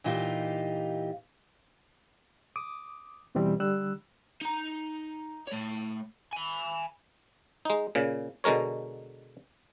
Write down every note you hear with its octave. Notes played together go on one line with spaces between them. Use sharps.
A#2 E3 D#4 F4 G4
D6 D#6
E2 B2 E3 G3 C4
D3 G3 E6 F#6
D#4 A#5
A3 C#5
G#5 B5
G#3 D#4
A#2 C#3
B2 D3 G#3 A#4 C#5